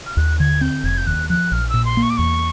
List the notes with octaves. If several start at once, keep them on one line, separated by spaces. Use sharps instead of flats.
F6
D#2 F#6
D3 G#6
C4 G6
F1 G#6
G6
D#2 F#6
F3 F#6
A#1 F6
A#2 E6
C6
A#3
C#6
D6
E2 C#6